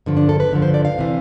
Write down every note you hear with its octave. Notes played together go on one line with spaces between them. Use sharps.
G2 D3 F3
D4
A4
B4
G2 D3 F3
C5
D5
F5
C3 E3